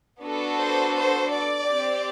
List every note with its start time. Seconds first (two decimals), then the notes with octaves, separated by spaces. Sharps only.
0.22 B3 D4 F#4 A4
0.58 C5
0.95 C5
1.32 D5
1.67 C4 G4